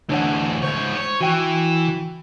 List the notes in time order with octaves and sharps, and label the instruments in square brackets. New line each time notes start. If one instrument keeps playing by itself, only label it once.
[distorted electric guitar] D2 E3 [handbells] D4 C#5 F#5
[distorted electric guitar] G#2 C#5 [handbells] C5 G6
[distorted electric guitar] C#5
[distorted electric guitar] E3 [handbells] F#4 G5